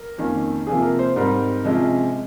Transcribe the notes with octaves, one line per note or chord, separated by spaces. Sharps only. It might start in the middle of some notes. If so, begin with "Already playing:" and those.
Already playing: A#4
F2 D#3 A#3 C#4
C3 F3 A#3 G#4
A#4
C5
G#2 G3 C4 A#4
C3 F3 G#3 C#4